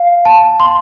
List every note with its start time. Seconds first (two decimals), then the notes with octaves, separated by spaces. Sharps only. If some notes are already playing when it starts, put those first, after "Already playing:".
Already playing: F5
0.25 A5
0.60 C6